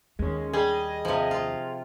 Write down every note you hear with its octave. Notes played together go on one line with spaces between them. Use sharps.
D#2 G#3 C#4
G3 G#4 D#5
C3 F3
F4